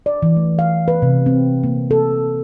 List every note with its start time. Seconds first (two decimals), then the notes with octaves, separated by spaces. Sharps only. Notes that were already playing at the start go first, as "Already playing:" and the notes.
0.06 D5
0.22 E3
0.37 A3
0.59 F5
0.88 B4
1.02 C3
1.26 C4
1.64 A#3
1.91 A4